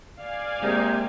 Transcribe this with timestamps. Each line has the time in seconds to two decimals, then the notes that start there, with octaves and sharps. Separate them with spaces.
0.20 D5 F5 G#5
0.62 C3 G#3 A#3 D#4